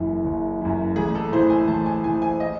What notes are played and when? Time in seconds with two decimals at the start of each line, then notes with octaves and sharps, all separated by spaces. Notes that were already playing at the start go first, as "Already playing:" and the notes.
Already playing: F#1 F#2 E3
0.24 F#1
0.61 F#2 E3
0.96 A1 G#4
1.15 A4
1.32 A2 E3 C5
1.50 G#5
1.68 A1 A5
1.86 G#5
2.04 A2 E3 G#5
2.22 G#5
2.40 D#5